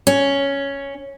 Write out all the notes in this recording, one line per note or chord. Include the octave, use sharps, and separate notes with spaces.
C#4